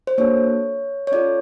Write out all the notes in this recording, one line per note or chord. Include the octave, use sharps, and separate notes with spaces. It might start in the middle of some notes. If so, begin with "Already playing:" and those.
C5
A#3 D4 F#4 A4 C#5
C#5
C#4 F4 A4 D5